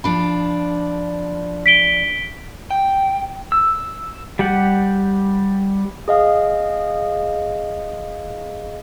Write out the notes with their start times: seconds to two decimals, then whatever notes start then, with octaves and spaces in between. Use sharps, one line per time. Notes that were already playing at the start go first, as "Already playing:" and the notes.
0.04 F3 D4 B5
1.66 B6 D7 G7
2.71 G5
3.52 E6
4.39 G3 G4 F#5
6.08 G#4 D#5 F5